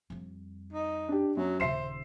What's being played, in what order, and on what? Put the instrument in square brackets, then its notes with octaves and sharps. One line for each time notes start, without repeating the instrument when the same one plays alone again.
[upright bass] F2 G3
[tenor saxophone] D#4
[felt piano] D4 G4
[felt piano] F#2 [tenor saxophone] F#3
[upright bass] D#1 C#3 [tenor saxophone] C5 [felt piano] E5 C7 E7